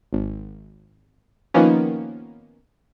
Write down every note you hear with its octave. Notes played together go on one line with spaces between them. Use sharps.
G#1
D#3 F3 A#3 B3 C#4